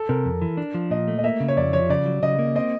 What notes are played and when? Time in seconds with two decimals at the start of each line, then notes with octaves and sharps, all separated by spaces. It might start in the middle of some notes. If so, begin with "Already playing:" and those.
Already playing: A4
0.09 C3 A#4
0.25 F2
0.42 E3
0.57 D4
0.74 F3
0.90 A#2 D#5
1.08 A3
1.18 D#5
1.24 A#3 E5
1.40 C#3
1.48 C#5
1.57 F2 D5
1.73 F3 C#5
1.89 C#3 D5
2.06 F#3
2.23 C#3 D#5
2.39 A#3
2.55 C4 D#5